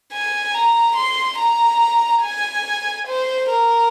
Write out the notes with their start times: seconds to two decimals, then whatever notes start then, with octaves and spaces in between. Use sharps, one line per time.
0.13 G#5
0.54 A#5
0.97 C6
1.39 A#5
2.23 G#5
3.07 C5
3.50 A#4